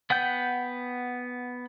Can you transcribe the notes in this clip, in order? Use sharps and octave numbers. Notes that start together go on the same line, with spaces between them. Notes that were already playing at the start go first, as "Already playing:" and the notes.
B3 F#5 G5 G6